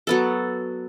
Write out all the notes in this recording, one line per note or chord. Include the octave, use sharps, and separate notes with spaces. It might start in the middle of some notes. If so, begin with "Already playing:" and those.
F#3 B3 A4